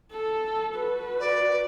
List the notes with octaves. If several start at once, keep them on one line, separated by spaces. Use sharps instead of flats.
A4
F#4 B4
D5